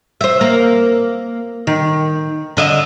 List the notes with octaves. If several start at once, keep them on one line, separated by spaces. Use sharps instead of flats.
C5 E5
A#3
D#3
D3 D#5 E5